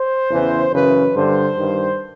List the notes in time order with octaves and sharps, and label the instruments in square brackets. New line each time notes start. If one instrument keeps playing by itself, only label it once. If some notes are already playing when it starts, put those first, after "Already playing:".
Already playing: [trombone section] C5
E2 C#3 E3
F#2 C#3 E3 B4
G2 D3 C5
G2 D#3